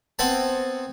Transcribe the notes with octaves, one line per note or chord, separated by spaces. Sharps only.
B3 C4 F#5 G#5 A5